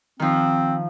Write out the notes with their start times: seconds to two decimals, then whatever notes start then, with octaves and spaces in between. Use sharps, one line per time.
0.20 D#3 F3 C4